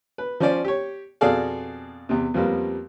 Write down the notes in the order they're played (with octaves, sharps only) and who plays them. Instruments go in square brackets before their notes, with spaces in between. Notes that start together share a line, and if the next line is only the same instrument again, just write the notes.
[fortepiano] B4
F3 C#4 C5 D5
G4 C#5
F2 B2 G#4 A4 D5 F5
E2 C3
F2 F3 G3 A#3 B3